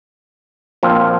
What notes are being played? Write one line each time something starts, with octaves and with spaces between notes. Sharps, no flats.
A#1 A#2 F3 C4 F4